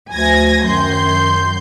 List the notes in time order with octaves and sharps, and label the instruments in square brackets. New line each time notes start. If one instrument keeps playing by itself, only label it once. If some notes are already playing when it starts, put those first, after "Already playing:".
[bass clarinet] D2 [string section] G#5 G#6 A#6
[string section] F#2 C6 G6 [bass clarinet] D#3